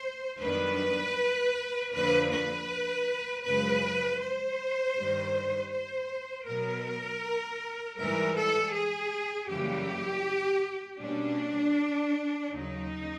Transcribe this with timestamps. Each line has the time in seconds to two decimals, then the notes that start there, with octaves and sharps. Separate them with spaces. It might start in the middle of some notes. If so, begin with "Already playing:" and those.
Already playing: C5
0.41 F#2 D#3 G3 B3 D4 B4
1.92 F2 D3 F3 A#3 D4 B4
2.31 B4
3.44 F#2 C#3 F3 G#3 B4
4.20 C5
4.95 G2 D#3 G3
5.70 C5
6.46 B2 F#3 B3 A#4
7.97 G#2 E3 G3 A#4
8.36 A4
8.73 G#4
9.48 F#2 C#3 E3 G3 A#3 G4
10.99 B2 G3 A#3 C#4 D4
12.50 D#2 C#3 F#3 D#4